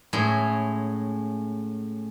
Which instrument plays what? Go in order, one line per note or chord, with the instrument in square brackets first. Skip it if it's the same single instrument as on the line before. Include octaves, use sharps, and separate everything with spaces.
[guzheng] A2 G#3 C#4 G#4 E5